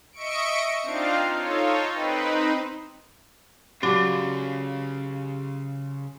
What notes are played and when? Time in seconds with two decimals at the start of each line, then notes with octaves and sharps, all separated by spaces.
0.12 D#5 E5 C#6 C#7 D7
0.83 C4 D4 D#4 F4 F5
1.34 D#4 F4 A4 C#5
1.93 C4 D#4 B4
3.83 C#3 F#3 D4 F4 G4